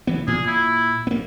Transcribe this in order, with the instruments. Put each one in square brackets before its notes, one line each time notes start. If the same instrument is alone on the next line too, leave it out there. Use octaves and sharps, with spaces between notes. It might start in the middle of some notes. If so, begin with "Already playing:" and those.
[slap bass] E3 B3
[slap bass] A#2 [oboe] G#4
[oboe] E4
[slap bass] A#3 B3